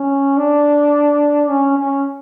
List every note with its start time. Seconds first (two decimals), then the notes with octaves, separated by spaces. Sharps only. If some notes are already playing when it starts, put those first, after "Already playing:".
Already playing: C#4
0.37 D4
1.49 C#4
1.78 C#4